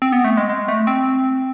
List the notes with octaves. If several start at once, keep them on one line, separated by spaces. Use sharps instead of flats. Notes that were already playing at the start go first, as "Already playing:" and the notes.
C4
B3
A3
G#3
G#3
A3
C4